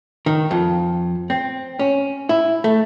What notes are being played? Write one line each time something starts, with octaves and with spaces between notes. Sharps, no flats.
D#3
F2
C4
C#4
E4
A3